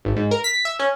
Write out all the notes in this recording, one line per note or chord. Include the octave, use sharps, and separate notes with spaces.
G#1
G#2
A#4
B6
E5
C#4